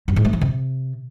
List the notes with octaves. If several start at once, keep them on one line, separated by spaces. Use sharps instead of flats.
F#2
G#2
A3
E3
C3